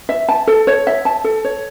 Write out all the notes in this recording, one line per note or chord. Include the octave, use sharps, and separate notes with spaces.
E5
A5
A4
C#5
E5
A5
A4
C#5